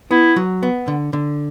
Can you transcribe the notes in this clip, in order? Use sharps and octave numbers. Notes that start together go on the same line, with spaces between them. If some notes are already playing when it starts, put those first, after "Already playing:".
B3 E4
F#3
B3
D3
D3